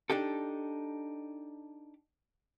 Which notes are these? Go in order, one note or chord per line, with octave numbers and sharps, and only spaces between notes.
D4 D#4 G4 A4